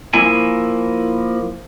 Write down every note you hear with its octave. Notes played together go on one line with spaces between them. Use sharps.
F3 A#3 E4 E5 G#5